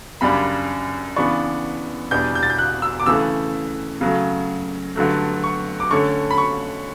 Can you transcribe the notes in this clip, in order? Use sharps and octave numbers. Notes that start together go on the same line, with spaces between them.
F#2 C#3 G3 D4 B5
C#3 E3 B3 D4 C#6
E2 B2 G3 D4 G6
G6
A6
G6
F#6
E6
D6
C#3 E3 A3 E6
C#3 F#3 A3
G2 D3 F#3 A3
C#6
D6
D3 A3 C#4 C#6
B5
C#6